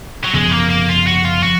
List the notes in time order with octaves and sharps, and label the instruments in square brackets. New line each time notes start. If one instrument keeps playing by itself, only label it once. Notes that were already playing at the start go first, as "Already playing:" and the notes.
[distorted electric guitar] F#3
[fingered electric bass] F#2 C#3 F3 B3 [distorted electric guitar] G#3
[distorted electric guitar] A#3
A#3
F4
F#4
F4
[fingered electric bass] F3 [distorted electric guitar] F#4